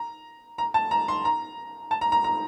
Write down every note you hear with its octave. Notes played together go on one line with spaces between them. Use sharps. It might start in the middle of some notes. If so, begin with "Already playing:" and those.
Already playing: A#5
A#5
A5
A#5
C6
A#5
A5
A#5
A#5
A#5